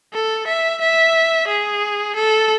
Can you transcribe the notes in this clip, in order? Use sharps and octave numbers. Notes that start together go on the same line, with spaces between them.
A4
E5
E5
G#4
A4